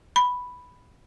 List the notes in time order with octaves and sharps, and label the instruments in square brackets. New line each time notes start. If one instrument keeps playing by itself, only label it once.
[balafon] B5